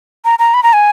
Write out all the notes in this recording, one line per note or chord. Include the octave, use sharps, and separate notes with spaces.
A#5
A#5
B5
A#5
G#5